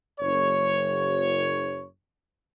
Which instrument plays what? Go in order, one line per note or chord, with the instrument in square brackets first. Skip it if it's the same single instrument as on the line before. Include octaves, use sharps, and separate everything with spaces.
[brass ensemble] F#1 C#5